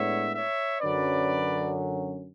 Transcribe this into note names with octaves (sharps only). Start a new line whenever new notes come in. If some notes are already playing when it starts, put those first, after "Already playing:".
Already playing: A2 G#3 B3 D4 C#5 E5
C#5 E5
F#2 D3 F#3 C#4 B4 D5